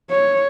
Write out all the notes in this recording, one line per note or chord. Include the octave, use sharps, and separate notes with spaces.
C#5